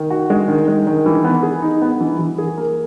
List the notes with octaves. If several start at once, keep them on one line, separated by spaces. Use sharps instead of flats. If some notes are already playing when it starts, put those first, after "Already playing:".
Already playing: D#3
F#4
G#3
D#3
G#3
D#3
E3
B3
G#4
D#4
B3
E3
E3
G#4
A#3